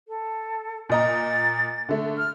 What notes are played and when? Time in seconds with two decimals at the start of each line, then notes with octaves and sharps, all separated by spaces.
0.08 A4
0.89 A#2 D#5 A#5 A6
1.89 D3 A3
2.18 F6